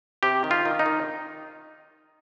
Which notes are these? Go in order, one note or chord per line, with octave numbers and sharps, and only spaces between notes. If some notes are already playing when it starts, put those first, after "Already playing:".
C3 G4
D#3
F4
D#3
D#4
D#3